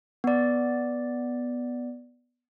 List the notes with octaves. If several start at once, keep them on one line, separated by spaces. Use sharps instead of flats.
B3 D5